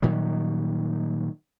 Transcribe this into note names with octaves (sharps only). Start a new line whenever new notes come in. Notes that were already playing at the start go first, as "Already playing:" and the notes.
A#2 D#3 F#3 G3